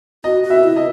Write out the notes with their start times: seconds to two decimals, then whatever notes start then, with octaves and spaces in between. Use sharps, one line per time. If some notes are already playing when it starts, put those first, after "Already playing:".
0.24 F#4 D#5
0.43 F#4
0.50 E5
0.64 E4
0.76 D#5